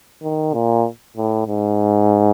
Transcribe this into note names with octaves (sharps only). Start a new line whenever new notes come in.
D#3
A#2
A2
G#2